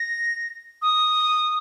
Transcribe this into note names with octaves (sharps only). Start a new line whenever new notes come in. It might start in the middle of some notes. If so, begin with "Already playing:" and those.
Already playing: A#6
D#6